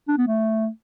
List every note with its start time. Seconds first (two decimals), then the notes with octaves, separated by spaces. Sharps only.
0.08 D4
0.17 B3
0.27 A3